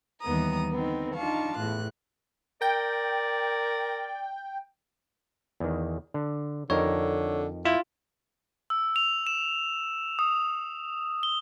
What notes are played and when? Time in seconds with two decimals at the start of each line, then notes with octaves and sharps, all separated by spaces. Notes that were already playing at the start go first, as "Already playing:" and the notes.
0.21 D#2 E3 G3 B3 A#5 D#6
0.70 D3 B3 C4 D#4
1.14 D4 D#4 F4 F5 A5 C#6
1.56 E2 A2 F#6
2.62 A#4 D5 G5
5.60 E2 D#3
6.14 D3
6.70 F2 D3 D#4 A#4 C#5
7.65 E4 F4
8.70 E6
8.96 F7
9.27 E7
10.19 D#6
11.23 G7